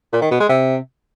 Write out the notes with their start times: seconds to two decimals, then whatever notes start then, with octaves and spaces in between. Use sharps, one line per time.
0.13 A#2
0.22 D#3
0.31 B2
0.40 G#3
0.49 C3